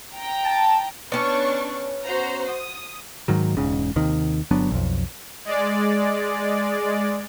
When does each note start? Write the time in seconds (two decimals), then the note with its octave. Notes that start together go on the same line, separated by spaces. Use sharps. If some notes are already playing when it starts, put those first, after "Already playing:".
0.15 G5 A#5
0.45 A5
1.12 B3 C#4 D4 C#6
2.03 F#4 C5 A#5
2.50 D#6
3.28 G#2 D#3 F#3
3.57 E1 C#2 G#2 C#3
3.96 D#2 C3 D#3
4.51 G1 F#3 B3 D4
4.71 B1 F2
5.45 G#3 D5